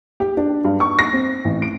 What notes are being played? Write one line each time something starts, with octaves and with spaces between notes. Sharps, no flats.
G4
D4
G2
C#6
A#6
C4
A1
D7